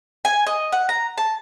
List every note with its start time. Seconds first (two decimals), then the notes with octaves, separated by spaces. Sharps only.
0.25 G#5
0.47 D#5
0.72 F#5
0.89 A#5
1.18 A5